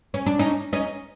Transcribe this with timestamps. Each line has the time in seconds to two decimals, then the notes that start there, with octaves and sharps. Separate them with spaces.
0.14 C#4
0.26 D4
0.39 C#4 D#4
0.73 C#4 D#4